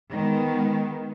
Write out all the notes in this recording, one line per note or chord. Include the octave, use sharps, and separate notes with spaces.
D#3 G#3 B3